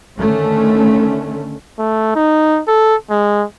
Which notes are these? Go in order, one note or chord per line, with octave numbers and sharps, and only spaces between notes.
D3 D#3 A3 C#4
A3
D#4
A4
G#3